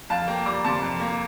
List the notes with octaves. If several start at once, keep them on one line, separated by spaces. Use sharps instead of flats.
F2 F5 A5
A#3 G5 A#5
G3 A#5 D6
C3 A5 C6
F2
A#3